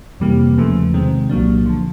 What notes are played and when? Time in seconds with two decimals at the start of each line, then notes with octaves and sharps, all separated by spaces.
0.20 F2 C3 E3 G3 A#3
0.57 E2 C#3 F3 A3
0.94 C3 D#3 G#3 C4
1.29 C2 A#2 F#3 A#3 D4
1.66 D3 F3